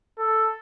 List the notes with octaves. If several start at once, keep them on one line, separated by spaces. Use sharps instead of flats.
A4